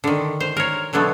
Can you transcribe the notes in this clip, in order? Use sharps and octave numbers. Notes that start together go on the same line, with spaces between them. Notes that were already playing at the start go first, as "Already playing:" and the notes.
D3 D#3
C5
A#4 C#5
B2 D3 F#3 A3 B3